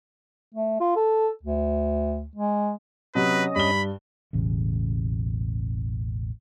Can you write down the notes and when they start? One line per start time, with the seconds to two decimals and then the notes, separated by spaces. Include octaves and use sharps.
0.55 A3
0.80 F4
0.96 A4
1.43 D2
2.36 G#3
3.15 C3 F#3 C#4 B4 D#5
3.56 G2 B5 G7
4.33 E1 A1 C#3